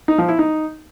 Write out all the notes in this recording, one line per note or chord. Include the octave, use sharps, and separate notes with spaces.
D#4
F3
E4
D#4